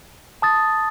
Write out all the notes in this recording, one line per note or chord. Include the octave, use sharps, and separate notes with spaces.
A5 D#6 A6